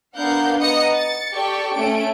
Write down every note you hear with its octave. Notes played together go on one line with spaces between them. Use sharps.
B3 D4 A#4 F5 F#5 G6
B3 D#5 F#5 A#5 D#6 C#7
A6 C#7
G4 A4 D5 G5 C#6
A3 C#4 D7